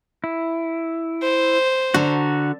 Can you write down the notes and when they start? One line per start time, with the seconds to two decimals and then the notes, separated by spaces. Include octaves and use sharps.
0.24 E4
1.22 C5
1.94 D3 F#4 A5 A#5